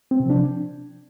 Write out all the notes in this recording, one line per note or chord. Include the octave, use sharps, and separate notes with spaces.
C4
C3
F3 D4